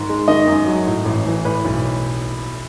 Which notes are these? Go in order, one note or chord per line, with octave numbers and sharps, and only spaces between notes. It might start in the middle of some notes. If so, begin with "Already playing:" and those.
Already playing: G#2 D#3
G#3
D#3 D#5
F#2
F#3
A2
A1
E3
A2 B4
B1